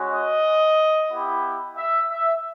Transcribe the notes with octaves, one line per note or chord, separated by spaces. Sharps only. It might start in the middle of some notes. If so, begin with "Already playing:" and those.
Already playing: G#3 C#4 F#4
D#5
B3 E4 G4
E5
E5